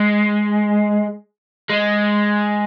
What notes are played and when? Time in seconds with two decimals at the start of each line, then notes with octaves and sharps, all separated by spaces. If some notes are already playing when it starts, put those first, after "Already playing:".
Already playing: G#3
1.69 G#3